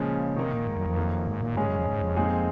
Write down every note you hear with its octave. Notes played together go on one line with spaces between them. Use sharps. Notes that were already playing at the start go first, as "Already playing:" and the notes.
Already playing: A#2 C#3 F3 G#3 C#4
C3 D#3 A#3 D#4
A#2
G#2
F#2
F2
F#2 D#3 A#3
G#2
A#2
G#2 C#3 G#3 C#4 G#4
F#2
F2
G#2
F2
A#2 G#3 C4 D#4 G#4